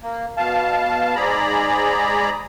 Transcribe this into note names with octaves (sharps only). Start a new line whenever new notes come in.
A#3
B2 F5 A5
G#2 G#4 D5 A#5 B5